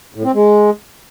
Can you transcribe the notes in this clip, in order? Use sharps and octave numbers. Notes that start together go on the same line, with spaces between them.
A2
C4
G#3